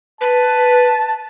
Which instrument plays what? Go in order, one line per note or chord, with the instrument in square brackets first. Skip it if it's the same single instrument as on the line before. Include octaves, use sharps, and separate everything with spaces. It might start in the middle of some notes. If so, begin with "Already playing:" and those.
[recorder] B4 [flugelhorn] A5